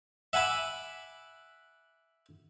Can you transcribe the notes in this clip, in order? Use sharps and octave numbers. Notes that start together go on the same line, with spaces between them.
E5 F#5 G#5 B5 D6